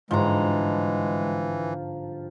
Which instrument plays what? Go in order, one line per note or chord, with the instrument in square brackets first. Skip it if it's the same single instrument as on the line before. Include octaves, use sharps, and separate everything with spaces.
[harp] G1 G#2 [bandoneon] E3 [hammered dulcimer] F3 A#5 [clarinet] G#3